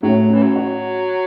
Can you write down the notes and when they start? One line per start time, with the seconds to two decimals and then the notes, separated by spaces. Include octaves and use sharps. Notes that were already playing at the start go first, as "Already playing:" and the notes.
0.03 A2 F#3
0.29 C#4
0.34 E3
0.43 F#3
0.56 F#4